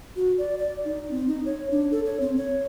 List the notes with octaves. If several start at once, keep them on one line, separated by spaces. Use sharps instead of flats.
F#4
D5
D5
D#4
C4
D#4
C#5
D4
A4
C#5
C4
C#5